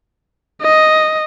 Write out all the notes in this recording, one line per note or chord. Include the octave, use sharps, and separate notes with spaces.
D#5